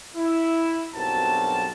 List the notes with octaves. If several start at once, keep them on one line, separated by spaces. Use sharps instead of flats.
E4
B1 G2 F#3 C4 A#4 A5